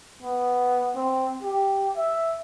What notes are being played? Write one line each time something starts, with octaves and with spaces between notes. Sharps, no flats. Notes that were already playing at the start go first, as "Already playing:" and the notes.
B3
C4
G4
E5